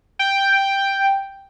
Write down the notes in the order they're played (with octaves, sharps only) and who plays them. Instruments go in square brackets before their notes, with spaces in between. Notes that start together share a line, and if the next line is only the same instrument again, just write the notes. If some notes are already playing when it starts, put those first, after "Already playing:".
[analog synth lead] G5